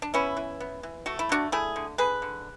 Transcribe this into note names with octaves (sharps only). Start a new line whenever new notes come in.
D4
B3 C#4 E4
E3
B3
E3
A3 F#4
E4
D3 D4 F#4
A3 E4 G#4
D3
D3 G#4 B4
D3